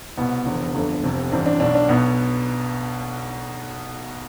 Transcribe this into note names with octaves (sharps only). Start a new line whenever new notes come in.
C2 B2 B3
F1 E2 D3
G1 F2 D3
F1 F2 C3
A1 G2 E3 C4
D4
B1 B2 D4
D4
B1 B2 B3